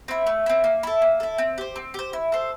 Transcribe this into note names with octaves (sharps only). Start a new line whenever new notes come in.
C4 E4
A3
C4 E4
A#3
E4 A4
A#3
E4 A4
C4
G4 C5
C4
G4 C5
E4
A4 C5